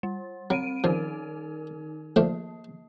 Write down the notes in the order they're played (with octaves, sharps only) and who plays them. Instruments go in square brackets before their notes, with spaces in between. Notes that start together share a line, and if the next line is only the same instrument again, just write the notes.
[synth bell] G3
[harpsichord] F#3 [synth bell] C4 D7 D#7
[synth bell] D#3 D#4 A#4 [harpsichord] F3
[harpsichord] F3 A3 D4 [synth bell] A#3